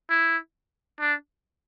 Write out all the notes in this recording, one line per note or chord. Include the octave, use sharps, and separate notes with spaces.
E4
D4